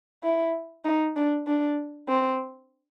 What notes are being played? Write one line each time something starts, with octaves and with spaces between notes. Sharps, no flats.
E4
D#4
D4
D4
C4